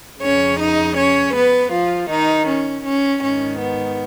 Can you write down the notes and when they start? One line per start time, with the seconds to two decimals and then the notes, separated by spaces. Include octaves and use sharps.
0.21 F2 C#3 C#4 C#5
0.59 D#4 D#5
0.96 C#4 C#5
1.34 B3 B4
1.72 F3 F4
2.09 D#3 D#4
2.47 C#4
2.85 C#4
3.22 G#2 D#3 C#4
3.59 B3